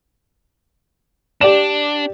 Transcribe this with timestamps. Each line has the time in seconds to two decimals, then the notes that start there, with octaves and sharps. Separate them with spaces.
1.41 D4 G4 D5 E7